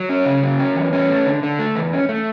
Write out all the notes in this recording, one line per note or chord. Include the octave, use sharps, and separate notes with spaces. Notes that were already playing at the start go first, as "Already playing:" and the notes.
Already playing: F#3
C#4
C#3
F#3
C#4
E2
C#4
A3
D3
D3
A3
E2
C#4
A3